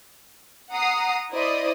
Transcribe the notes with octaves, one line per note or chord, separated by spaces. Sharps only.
F#5 A#5 D#6 C7
E4 C5 D5 D#5 D#6